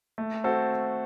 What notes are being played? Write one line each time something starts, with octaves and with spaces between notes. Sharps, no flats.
A3
C4 F#4 A4 C5